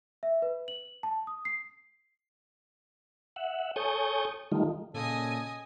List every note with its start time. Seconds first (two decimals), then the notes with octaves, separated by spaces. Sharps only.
0.23 E5
0.42 B4
0.68 F#7
1.03 A5
1.27 D#6
1.45 C7
3.36 E5 F#5
3.76 A4 C#5 G#5 C#6 D#6 G6
4.52 D#3 G3 A3 D#4 F4
4.94 A#2 C#3 A4 D#5 G#5 D#6